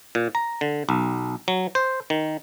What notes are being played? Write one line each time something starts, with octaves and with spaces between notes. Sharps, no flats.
A#2
A#5
D3
B1
F#3
C5
D#3